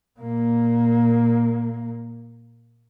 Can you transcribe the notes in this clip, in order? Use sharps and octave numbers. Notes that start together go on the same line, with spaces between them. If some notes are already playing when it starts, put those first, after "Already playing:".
A#2 A#3